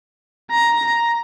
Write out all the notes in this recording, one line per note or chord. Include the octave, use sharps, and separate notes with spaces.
A#5